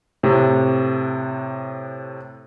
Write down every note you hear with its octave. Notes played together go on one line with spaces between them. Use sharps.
A2 C3